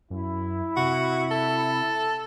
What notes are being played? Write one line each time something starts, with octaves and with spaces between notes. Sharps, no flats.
F#2 E4
C3 F#4
A4